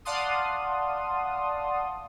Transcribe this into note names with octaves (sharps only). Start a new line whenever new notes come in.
D5 F5 F#5 A5 C6 D#6